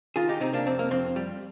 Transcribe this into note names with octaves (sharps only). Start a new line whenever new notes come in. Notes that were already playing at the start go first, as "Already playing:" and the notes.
D#3 F4 G#4
D#4 G4
C3 C4 D#4
A#3 D4
F2 C4
A#3
F2 C4
G3